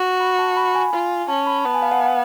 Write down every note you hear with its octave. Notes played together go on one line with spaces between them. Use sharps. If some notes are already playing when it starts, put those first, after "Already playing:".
Already playing: F#4
B5
A5
B5
G#5
F4
C#4 A5
B5
B5
B3 A5
G#5
F5
F#5
F5